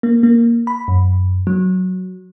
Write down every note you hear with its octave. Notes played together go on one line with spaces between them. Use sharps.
A#3
A#3
B5
F#2
F#3